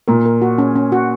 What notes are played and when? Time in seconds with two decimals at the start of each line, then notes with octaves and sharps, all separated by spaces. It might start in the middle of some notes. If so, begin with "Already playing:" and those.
0.08 A#2 A#4
0.26 A#4
0.42 F#4
0.58 C#4
0.76 C#4
0.92 F#4